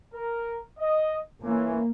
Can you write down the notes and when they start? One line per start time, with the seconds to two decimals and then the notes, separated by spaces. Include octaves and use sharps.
0.14 A#4
0.79 D#5
1.43 E3 A#3 C#4 F4